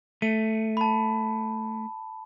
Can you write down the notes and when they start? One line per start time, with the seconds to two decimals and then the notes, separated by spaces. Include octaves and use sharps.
0.22 A3 D#7
0.77 A5 B5